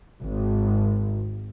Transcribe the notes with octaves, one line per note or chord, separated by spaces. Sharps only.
G#1